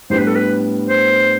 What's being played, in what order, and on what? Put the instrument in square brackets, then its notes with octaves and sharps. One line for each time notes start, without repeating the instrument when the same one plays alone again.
[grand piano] A2 G3 B3 D4 [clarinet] C5
[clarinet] B4
A4
B4
C5